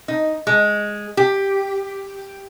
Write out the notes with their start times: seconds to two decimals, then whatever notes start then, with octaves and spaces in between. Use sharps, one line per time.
0.08 D#4
0.47 G#3
1.17 G4